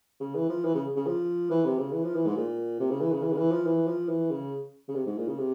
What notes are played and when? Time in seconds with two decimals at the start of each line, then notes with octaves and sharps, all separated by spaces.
0.20 C#3
0.35 E3
0.49 F3
0.64 E3
0.75 C#3
0.96 C#3
1.07 F3
1.50 E3
1.65 C3
1.79 C#3
1.93 E3
2.05 F3
2.15 E3
2.26 G#2
2.37 A#2
2.80 C3
2.91 C#3
3.01 E3
3.12 C#3
3.23 E3
3.32 C#3
3.38 E3
3.51 F3
3.66 E3
3.87 F3
4.09 E3
4.31 C#3
4.89 C#3
4.95 C3
5.06 G#2
5.18 A#2
5.28 C#3
5.39 C3